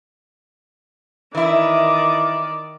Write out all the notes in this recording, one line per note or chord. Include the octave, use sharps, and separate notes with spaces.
D#3 E3 E4 D5